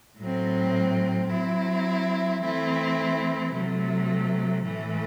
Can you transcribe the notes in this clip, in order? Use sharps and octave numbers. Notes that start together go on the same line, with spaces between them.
A2 F#3 C4
F#3 C4 E4
E3 A3 C4 E4
C3 F#3 A3
A2 E3 A3